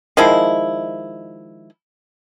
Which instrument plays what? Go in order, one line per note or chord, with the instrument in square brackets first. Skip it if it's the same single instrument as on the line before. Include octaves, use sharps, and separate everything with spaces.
[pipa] D#3 F3 G#3 E4